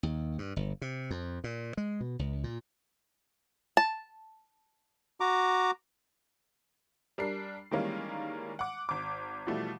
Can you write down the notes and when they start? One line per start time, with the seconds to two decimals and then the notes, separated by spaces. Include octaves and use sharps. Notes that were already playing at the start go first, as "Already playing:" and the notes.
0.03 D#2
0.38 G2
0.56 G1
0.82 C3
1.11 F2
1.44 A#2
1.77 G#3
2.01 B2
2.19 C#2
2.44 A#2
3.77 A5
5.20 F#4 A#5 D6
7.18 G3 D4 A#4 C7
7.71 D#3 E3 G3 G#3 A#3 C#4
8.59 F#5 D6
8.89 G#1 D6
9.47 B2 E3 F3 G3 A3